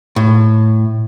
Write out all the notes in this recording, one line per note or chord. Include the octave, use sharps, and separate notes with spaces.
A2